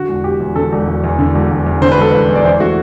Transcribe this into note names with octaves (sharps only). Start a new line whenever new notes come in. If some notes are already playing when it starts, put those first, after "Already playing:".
Already playing: D3 F#4
E1
E1 G4
E2
D3 A4
E1
E1
E2
D3
E1
E1
E2
D3 C5
B4
E1 A4
E1 B4
E2
D5
E3 C5
A3 F#4